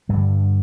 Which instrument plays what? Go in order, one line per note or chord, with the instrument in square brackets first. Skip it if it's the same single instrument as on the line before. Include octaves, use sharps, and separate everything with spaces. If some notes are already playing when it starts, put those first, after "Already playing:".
[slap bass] G2 D3 G3